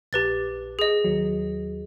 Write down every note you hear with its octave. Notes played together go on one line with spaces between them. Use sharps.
A#1 G4 B4 A6
G#4 D#5
D#2 F#3